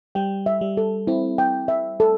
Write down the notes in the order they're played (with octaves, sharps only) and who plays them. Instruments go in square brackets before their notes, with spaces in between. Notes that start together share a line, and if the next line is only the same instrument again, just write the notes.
[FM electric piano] G3 [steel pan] G5
[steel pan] E5
[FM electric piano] G3
[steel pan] A4
[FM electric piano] C4 [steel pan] E4
[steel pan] G5
E5
A4